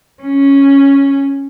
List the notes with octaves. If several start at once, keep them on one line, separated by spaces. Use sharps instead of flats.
C#4